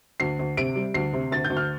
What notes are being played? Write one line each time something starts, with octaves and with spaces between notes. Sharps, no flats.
D2 C7
D2
C3 D7
G3
D2 C7
C3
D2 A6
G6
D2
F6